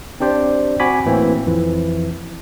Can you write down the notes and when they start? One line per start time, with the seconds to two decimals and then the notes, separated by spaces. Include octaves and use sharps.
0.20 C4 D4 G4 C5 D5
0.80 C4 F#4 G#5 B5 D6 B6
1.06 A2 E3 A#3 C4
1.46 F2 E3 F3